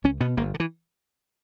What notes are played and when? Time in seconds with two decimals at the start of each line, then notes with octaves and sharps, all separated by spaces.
0.04 C#2 C#4
0.21 B2 B3
0.37 G1 A#3
0.54 D3
0.60 E3